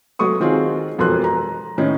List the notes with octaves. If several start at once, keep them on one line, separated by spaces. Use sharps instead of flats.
F#3 A3 C#6 D#6
D#3 C4 F4 F#4 G#4
E1 F2 A4 A#4 C6 F#6
A#5
A2 D#3 C#4 D#4